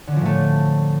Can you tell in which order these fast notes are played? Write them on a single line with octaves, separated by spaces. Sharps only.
D3 C#4 F3 A2 A3